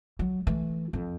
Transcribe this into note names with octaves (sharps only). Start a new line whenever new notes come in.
F#3
E3 A3
F2